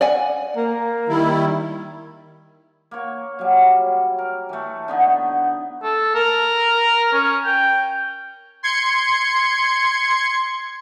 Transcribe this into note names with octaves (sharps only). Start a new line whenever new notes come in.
D5 F#5 G#5
A#3
D#3 G3 E4
A#3 C#5
F#3 G3
A#4
E3 A3
D3 B3 D#4
A4
A#4
C#4
G5
C6 G#6 C#7